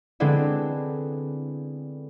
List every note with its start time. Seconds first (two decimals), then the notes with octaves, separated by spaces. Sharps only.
0.20 D3 G#3 B3 C4 D4 E4